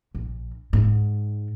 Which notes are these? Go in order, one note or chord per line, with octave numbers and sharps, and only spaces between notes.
A#1
G#2